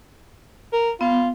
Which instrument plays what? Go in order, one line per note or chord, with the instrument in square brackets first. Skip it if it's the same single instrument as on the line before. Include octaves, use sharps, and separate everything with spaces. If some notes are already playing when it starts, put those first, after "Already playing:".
[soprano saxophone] A#4
[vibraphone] B3 [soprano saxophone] F4